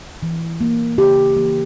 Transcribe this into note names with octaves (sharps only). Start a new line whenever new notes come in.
E3
A#3
C#3 G4
E3 A#3